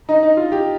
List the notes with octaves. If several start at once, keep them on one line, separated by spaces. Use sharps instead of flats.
D#4
D#4
F4
G4